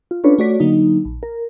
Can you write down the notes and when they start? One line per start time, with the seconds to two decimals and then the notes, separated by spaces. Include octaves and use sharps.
0.11 F4
0.24 C#4 D4 F4 A4 B4 C#5
0.38 A3 F#4 C#5 D5 B6
0.60 D3 F#3 A#3 D#4
1.05 A#1
1.23 A#4